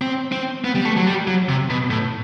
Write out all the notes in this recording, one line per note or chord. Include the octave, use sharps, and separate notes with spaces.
C4
C4
B3
G3
A3
F#3
G3
F#3
C3
B2
A2